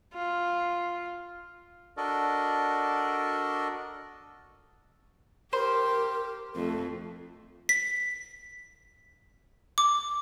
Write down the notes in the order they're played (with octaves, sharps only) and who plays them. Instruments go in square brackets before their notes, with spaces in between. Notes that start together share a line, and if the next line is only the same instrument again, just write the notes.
[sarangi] F4
[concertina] D4 F#4 A4 A#4 D5 D#5
[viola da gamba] G4 [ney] A#4 [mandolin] C5
[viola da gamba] F2 [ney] A3
[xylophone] B6
D6